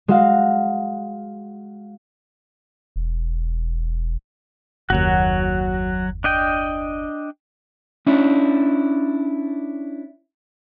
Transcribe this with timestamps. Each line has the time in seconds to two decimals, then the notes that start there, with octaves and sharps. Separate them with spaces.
0.08 G#3 F#4 F5
2.96 E1
4.90 F#1 D#2 F#3 F#4
6.24 D4 D#5 G5
8.07 C#4 D4 E4